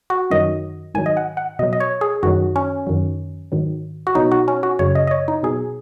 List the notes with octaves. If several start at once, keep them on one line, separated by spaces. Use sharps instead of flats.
F#4
F#2 D#3 F#3 D#5
G#2 D#3 F#3 G#5
D#5
F#5
F#5
B2 F#3 D#5
D#5
C#5
G#4
F#2 D#3 F#3 F#4
C#4
F#2 D#3 F#3
G#2 D#3 F#3
F#4
B2 F#3 D#4
F#4
C#4
F#4
F#2 C#3 F#3 C#5
D#5
D#5
C#5
D#4
B2 F#3 G#4